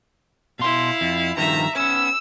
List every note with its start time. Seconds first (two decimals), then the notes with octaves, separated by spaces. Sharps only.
0.59 B2 E4 F5 C6
1.01 F2
1.38 G2 D#3 F3 E5 A#5
1.76 B3 C#4 E6